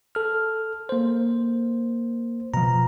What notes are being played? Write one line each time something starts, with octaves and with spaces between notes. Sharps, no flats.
A4 F6
A#3 C5
B2 F3 A#5